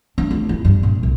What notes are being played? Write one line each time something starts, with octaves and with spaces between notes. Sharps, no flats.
D4
D2
E4
G2
A#2
C2